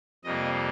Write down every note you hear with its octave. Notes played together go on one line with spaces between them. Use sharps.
F2 C3 G3 A#3 D#5